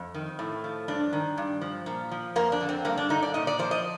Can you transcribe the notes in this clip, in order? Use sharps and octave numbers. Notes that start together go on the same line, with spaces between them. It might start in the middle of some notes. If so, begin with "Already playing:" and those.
Already playing: F2
D#3
A2
F3
G2 D4
D#3
G2
F3
A#2
F3
F2 A#3
D4
D3
C4
G2 A#3
D4
D3 D#4
D5
A#2 D#5
D5
F3 C5
D#5